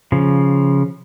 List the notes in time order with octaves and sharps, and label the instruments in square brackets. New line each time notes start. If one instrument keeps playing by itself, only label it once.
[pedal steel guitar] C#3 F3